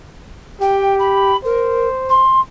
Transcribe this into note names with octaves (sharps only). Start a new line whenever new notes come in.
G4 G5
B5
A#4 C5
C6